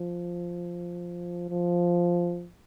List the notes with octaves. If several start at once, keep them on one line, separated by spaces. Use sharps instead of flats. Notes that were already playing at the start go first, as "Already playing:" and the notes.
Already playing: F3
F3